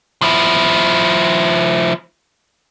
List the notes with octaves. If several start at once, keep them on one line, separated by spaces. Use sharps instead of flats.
F3 E4